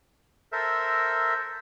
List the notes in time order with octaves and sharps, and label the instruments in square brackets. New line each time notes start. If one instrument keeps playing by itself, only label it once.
[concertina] A4 A#4 C5 E5